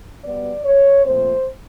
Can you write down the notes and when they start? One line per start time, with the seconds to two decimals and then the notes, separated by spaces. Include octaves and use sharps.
0.23 B2 G3 B3 D5
0.64 C#5
1.04 A#2 F3 A3 C4 C5